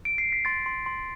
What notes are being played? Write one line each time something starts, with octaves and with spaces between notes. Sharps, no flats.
D7
C7
B6
C6 A6
C6
C6